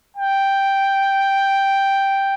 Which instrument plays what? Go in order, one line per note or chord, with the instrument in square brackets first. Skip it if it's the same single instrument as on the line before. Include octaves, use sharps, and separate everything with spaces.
[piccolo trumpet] G5